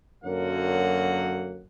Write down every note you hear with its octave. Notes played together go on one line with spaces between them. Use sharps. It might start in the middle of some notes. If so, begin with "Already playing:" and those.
F#2 D3 F#3 A#3 F#5